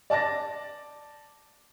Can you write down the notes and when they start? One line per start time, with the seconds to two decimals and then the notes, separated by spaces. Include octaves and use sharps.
0.10 D5 A5 D6 A6 A#6